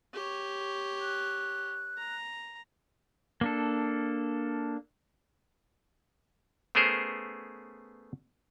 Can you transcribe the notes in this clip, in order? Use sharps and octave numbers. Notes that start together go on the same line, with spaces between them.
G4 C#5
F#6
A#5
A#3 D4 A4
A3 B3 C#4 G#4 A#4 C5